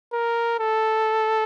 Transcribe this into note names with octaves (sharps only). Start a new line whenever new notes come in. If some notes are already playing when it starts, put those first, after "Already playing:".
A#4
A4